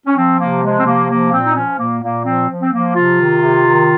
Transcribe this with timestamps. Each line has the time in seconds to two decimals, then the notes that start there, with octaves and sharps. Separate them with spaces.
0.06 C#4
0.16 F3 C4
0.39 C3 A#3
0.62 F3 G#3
0.79 C4
0.86 C3 A#3
1.09 F3 A#3
1.32 A#2 C4
1.46 D#4
1.55 F3 C#4
1.79 A#2 A#3
2.02 A#2 A#3
2.25 F3 C4
2.48 F3
2.61 C4
2.72 F3 A#3
2.95 C3 F4
3.18 D#3
3.42 C3
3.65 D#3